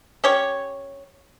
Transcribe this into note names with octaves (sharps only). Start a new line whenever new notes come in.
C#4 G4 C#5